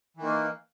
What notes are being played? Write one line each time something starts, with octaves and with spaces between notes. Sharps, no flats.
D#3 E3 A#3